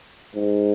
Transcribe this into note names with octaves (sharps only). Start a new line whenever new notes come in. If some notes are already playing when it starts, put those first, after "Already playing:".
G#2